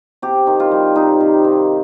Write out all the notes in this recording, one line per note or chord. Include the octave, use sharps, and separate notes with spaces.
C3 G4
D#3
F4
G3
C3 D#4
C3
D#3